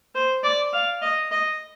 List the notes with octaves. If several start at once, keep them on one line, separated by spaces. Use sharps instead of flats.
C5
D5
F5
D#5
D#5